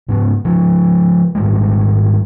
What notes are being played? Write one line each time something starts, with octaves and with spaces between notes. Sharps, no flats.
G#2 C#3 B3
C#3 F3
G#2 D#3 G3 G#3